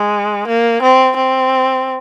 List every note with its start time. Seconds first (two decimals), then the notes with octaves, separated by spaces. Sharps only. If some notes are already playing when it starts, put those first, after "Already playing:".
Already playing: G#3
0.47 A#3
0.82 C4
1.17 C4